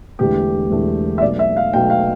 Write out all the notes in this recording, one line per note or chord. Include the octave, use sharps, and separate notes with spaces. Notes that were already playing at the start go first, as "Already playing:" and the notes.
E1 E2 D3 A3 G4
E1 E2 D3 A3
E5
B1 B2 A3 D5
E5
F5
B1 B2 A3 G5
F5